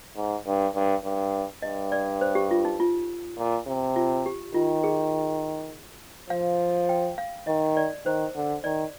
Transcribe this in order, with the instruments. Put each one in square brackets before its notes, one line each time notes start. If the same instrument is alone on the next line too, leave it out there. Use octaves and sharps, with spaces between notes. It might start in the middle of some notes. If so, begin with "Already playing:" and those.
[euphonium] G#2
G2
G2
G2
[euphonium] G2 [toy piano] D#5
[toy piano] D5
C5
G4
F4
D#4
F4
[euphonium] A#2
C3
[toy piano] F4
G4
[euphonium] D#3 [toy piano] F4
[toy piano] G#4
[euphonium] F3 [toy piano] F5
[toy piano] G5
F5
[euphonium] D#3 [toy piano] D#5
[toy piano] D5
[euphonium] D#3 [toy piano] C5
[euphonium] D3
[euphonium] D#3 [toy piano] D5